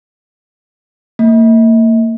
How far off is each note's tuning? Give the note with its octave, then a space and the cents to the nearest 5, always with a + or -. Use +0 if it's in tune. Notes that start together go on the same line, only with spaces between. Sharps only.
A#3 -35